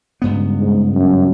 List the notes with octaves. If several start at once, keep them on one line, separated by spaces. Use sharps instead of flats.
C#2 G2 B3
G#2
F#2